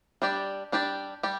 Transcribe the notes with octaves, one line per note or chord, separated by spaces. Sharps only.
G3 D4 G4 D5
G3 D4 G4 D5
G3 G4 D5